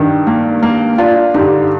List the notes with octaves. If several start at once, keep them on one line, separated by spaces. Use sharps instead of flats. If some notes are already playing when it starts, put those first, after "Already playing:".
Already playing: G2 D#3
A#3
A#3
D4 F4
G2 D3 D#4 G4